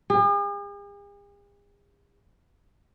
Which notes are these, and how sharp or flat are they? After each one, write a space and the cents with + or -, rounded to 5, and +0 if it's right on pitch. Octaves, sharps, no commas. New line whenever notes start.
G#4 -45